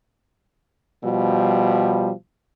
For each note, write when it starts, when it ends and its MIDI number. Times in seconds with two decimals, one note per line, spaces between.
1.04 2.11 47
1.04 2.11 53
1.04 2.11 55